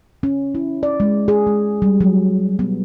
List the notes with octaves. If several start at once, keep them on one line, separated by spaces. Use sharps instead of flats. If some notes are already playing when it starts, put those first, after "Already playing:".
C#4
E4
D5
G#3
G#4
G#3
G3
F#3
B3